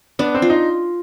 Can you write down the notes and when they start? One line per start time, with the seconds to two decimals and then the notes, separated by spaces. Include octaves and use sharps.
0.19 B3 D4
0.34 C4
0.42 F4
0.50 D#4